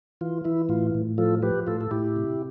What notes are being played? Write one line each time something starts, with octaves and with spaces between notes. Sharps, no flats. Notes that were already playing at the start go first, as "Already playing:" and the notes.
E3 F4
E3 E4
A2 F4
A2
F3 F4 A4
F3 G4 B4
A2 F4 A4
A4
A2 E4 G4
C3